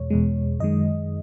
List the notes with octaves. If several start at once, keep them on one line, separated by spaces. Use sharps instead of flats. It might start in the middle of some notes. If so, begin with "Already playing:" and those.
Already playing: E2 B2 G#3 C#5
E2 B2 G#3
F#2 D#3 G#3 D#5